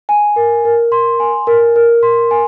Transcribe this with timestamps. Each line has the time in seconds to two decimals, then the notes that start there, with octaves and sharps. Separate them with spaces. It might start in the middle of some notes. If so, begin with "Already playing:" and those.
0.09 G#5
0.36 A#4
0.65 A#4
0.92 C6
1.20 G#5
1.47 A#4
1.76 A#4
2.03 C6
2.31 G#5